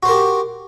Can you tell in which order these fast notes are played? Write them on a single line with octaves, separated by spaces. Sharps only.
F#4 C5 A#4 G4